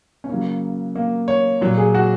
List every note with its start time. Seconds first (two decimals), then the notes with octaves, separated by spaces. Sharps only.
0.24 C#4
0.29 C#3 F#3 A#3
0.95 A#3
1.28 C#5
1.61 A#2 F#3
1.78 G#4
1.94 F#4